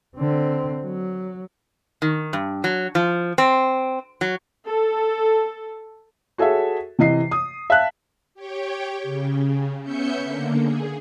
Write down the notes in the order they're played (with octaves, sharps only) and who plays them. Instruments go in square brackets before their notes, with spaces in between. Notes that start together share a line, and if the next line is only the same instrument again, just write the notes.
[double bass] D3 C4
F#3
[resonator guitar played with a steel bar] D#3
G2
F#3
F3
C4
F#3
[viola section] A4
[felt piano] F#4 G#4 A4 C#5 E5
C3 E3 D#5 C7
D#6
E5 F5 A5 F#6
[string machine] G4 C#5 G5
C#3
B3 C#4 E5 G6 C#7
D3 A#3
G#4